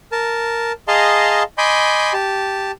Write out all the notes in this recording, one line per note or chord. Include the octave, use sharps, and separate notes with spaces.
A#4 A5
G#4 D#5 F5 A5 A#5 C6
D#5 G#5 B5 C6 D6 G6
G4 A5